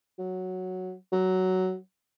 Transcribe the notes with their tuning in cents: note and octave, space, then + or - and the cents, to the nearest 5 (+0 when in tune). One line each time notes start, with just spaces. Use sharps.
F#3 +0
F#3 +10